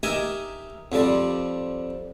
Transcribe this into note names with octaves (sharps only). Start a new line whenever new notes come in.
D#4 G4 A#4 E5 G#5
F2 F3 G3 D5